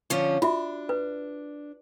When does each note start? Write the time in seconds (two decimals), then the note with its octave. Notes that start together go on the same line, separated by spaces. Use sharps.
0.10 D3 F3 C#4
0.42 D4 F4 F#4 E5
0.89 B4